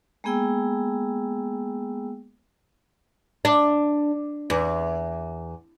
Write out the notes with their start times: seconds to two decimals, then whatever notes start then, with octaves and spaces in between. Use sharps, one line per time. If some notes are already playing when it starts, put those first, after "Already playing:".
0.24 G#3 A#3 B3 G#4 G5 E6
3.45 D4
4.50 E2